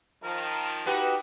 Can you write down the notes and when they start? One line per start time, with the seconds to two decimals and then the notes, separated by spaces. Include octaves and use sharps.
0.24 D#3 F3 A#4
0.86 D#4 F#4 G4 B4 F#5